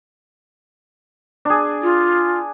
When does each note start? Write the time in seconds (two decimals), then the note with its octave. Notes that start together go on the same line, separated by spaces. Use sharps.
1.45 D4 G#4
1.83 F4